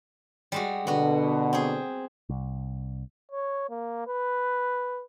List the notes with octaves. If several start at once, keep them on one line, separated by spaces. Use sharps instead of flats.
G3 G#3 F#4
B2 D3 B3 F#4
C4 G#4
C2
C#5
A#3
B4